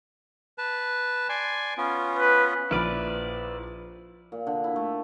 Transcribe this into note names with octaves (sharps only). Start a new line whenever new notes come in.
B4 A5
D5 G#5 C6
B3 C#4 F4
B4
A#1 E4 B4 D5 F6 D7
A#2
D3
E4
A3